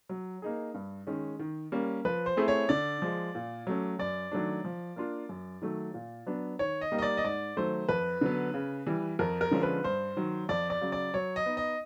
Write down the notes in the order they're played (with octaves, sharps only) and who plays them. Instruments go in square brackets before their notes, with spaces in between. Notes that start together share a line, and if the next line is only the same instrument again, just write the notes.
[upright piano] F#3
A#3 D#4 G#4
G2
D#3 G#3 C#4
D#3
G3 A#3 C#4
[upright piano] F3 [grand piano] B4
[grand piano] C5
[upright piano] A3 C4 E4 G#4
[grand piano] C#5
[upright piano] D3 [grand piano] D5
[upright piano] F3 G#3
A#2
F#3 A3 C#4
[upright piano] F#2 [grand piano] D5
[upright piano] D#3 F#3 A3 D4
F3
A#3 D4 F4
F#2
D#3 F#3 A3
A#2
F#3 B3 D4
[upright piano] D#3 [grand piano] C#5
[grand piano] D#5
[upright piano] G3 A#3 D#4 G4
[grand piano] D#5
D5
D#5
[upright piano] G#2 [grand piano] D5
[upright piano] D#3 F#3 A3 [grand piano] C5
[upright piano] F2 [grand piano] B4
[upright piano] D3 F#3 B3
C#3
E3 G3
[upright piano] F2 [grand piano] A#4
[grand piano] A#4
[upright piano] D3 F3 G#3 C#4
[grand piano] B4
[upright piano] G2 [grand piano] C5
[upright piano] D#3 F#3
[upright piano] F2 [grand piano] D5
[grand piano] D5
[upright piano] C#3 F#3
[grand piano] D5
[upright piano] F#3 [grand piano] C#5
[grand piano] D#5
[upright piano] B3 D#4
[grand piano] D#5